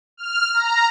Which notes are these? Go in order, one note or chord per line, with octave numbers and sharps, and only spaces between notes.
F6
A#5